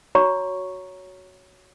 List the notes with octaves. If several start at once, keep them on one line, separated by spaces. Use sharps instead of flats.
F#4 C#5 A#5 C#6